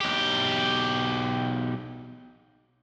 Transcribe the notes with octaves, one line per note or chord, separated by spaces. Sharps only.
B1 G4